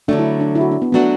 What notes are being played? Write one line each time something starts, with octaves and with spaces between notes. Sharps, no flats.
D3 F#3 A3 D4
E4
D4
E4
F#4
D4
B3
F#3 A3 B3 D4 F#4